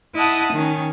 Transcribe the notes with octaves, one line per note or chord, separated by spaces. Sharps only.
E4 D#5 F#5 A5 D#6
D#3 C#4